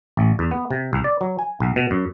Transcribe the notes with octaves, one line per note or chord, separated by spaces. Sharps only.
A1
E2
B3
C3
C2
D5
F#3
G#5
B1
B2
F#2